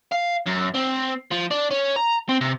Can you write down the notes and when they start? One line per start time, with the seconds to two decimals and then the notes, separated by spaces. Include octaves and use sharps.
0.12 F5
0.47 F#2
0.75 C4
1.31 F3
1.51 D4
1.71 C#4
1.96 A#5
2.29 C4
2.41 C3